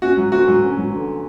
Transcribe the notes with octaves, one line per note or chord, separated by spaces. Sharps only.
C#4 F#4
F#3
D2 F#4
F#3
C#4
F#3
D3